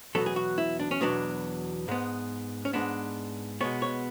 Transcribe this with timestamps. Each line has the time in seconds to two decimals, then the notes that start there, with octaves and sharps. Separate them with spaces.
0.15 E2 B2 F#3 B3 A4
0.26 G#4
0.36 F#4
0.58 E4
0.80 D4
0.91 C#4
1.01 E2 B2 F#3 B3 D4
1.88 G#2 G#3 B3
2.65 C#4
2.73 G#2 G#3 B3 D4
3.61 B2 G#3 B3 C#5
3.82 C#5